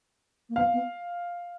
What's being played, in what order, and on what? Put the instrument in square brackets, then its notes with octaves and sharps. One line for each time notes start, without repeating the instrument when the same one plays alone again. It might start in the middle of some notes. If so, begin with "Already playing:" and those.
[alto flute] A#3
[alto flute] B3 [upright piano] F5
[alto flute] B3